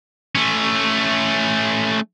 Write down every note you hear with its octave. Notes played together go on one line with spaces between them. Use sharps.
A3 C#4